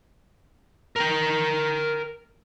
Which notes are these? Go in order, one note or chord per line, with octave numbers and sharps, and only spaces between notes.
A#4 G5